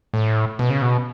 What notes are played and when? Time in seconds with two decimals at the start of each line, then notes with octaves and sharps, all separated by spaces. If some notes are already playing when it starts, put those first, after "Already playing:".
0.14 A2
0.59 B2
0.70 C#3
0.82 B2